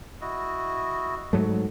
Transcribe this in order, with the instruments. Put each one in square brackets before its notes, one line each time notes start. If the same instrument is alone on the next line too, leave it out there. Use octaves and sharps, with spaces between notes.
[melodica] E4 F#4 D#5
[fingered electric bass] G#2 F#3 A3